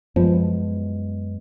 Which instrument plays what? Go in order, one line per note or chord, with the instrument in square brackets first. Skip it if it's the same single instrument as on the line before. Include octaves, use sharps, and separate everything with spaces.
[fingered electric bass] F#2 G#3 B3 [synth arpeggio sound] F3